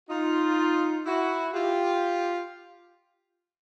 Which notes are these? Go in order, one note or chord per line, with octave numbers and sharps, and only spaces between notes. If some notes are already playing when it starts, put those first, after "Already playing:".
D#4 F4
E4 F#4
F4 G4